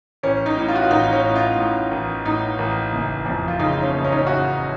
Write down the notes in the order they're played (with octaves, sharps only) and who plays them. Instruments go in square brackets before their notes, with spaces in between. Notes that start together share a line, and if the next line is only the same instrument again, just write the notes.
[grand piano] A1 C#4
D#4
A2
F4
F#4
F4
A1 D#4
C#4
A2
F4
A2
A1
A2 D#4
A1
F#1
F2
F4
C#3 D#4
C#4
F#1
C#4
D#4
C#4
C#3 F#4